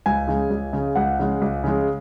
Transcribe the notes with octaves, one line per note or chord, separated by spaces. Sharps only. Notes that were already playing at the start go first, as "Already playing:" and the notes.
C#2 G#5
C#3 G#3
C#2
C#3 G#3
C#2 F#5
C#3 G#3
C#2
C#3 G#3